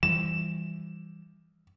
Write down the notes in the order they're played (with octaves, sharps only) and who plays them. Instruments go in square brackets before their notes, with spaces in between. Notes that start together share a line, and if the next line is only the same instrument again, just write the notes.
[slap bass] E3 F3 G3 [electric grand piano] E7